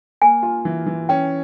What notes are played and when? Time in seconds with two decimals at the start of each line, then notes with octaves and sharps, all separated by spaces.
0.22 A#3 G#5
0.43 F4
0.65 E3
0.86 E3
1.09 C#4 G5